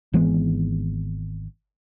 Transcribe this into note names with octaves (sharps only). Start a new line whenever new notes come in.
G#1 E3 G#3 B3